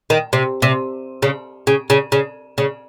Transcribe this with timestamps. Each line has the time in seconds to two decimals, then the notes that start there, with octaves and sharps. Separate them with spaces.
0.10 D#3
0.33 C3
0.62 C3
1.22 C#3
1.67 C#3
1.90 C#3
2.12 C#3
2.58 C#3